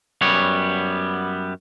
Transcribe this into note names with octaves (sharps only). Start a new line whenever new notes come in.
F#2 G3 B3 C#5